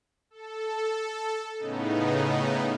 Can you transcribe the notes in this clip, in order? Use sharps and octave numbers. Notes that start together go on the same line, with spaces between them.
A4
A2 C#3 B3 D#4